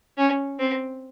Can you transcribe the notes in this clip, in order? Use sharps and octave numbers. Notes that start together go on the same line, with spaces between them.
C#4
C4